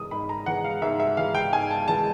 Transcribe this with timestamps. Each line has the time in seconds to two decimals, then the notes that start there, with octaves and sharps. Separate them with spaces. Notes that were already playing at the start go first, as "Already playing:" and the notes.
Already playing: G#2 E3 G#3 D#6
0.11 G#2 B5
0.29 A#5
0.46 E3 G#3 F#5
0.64 F5
0.82 G#2 E5
1.00 E5
1.17 E3 G#3 F5
1.35 G5
1.52 G#2 G#5
1.71 A5
1.88 E3 G#3 A5